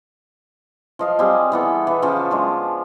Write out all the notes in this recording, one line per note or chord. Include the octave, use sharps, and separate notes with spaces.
F3 D#5 F5
G3 C4 G#4
E3 B3 A4
E3
C#3 F3
G#3 D4